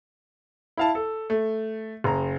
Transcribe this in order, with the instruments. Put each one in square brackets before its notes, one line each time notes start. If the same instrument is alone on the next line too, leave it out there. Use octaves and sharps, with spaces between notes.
[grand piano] E4 F5 A5
A4
A3
F#1 A#5